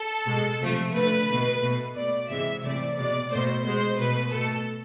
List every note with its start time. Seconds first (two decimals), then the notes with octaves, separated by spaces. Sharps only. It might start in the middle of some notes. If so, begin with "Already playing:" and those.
Already playing: A4
0.26 B2 G#3
0.60 C3 F3 A3
0.94 D3 A3 B4
1.28 B2 A3
1.62 B2 A3
1.96 B2 A3 D5
2.30 C3 E3 G#3 E5
2.64 C3 E3 A3 D5
2.97 B2 G#3 D5
3.32 B2 A3 C5
3.65 B2 G#3 C5
3.99 B2 A3 B4
4.33 B2 A3 A4